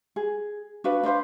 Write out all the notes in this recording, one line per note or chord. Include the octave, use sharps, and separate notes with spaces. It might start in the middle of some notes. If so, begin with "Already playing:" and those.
G#4
D4 F#4 B4 F5
D4 B4 C5 F5